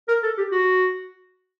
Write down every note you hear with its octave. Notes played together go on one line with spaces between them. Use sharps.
A#4
A4
G4
F#4